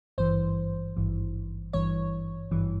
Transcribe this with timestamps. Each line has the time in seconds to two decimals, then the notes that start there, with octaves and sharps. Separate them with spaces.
0.18 G#1 G2 E3 C5
0.96 G#1 G2 E3
1.73 G#1 G2 E3 C#5
2.51 G#1 G2 E3